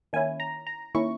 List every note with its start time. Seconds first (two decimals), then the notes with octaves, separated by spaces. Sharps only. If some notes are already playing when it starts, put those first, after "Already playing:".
0.13 D#3 A#3 C#4 E4 G#5
0.40 A#5
0.67 A#5
0.95 D#3 A#3 C#4 E4 C#6